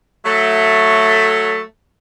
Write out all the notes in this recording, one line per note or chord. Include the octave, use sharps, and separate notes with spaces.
F#3 A3